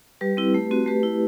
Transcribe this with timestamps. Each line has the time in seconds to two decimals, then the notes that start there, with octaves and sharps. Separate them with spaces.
0.21 G3 G4 B4
0.37 C4 E4
0.54 A3
0.71 C4 F#4
0.86 A3 G4 B4
1.03 E4